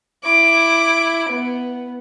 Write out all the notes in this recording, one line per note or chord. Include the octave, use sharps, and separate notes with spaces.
E4 D6
B3